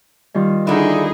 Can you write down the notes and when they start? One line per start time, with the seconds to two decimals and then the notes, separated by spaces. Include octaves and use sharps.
0.34 D#3 G3 F4
0.67 D3 D#4 E4 G#4